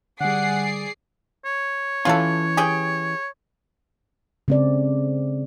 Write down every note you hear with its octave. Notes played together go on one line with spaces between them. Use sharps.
D3 G3 G#4 D5 F#5 C7
C#5
E3 C#4 F4 A4
G4 G#4 G5
C#3 C4 D5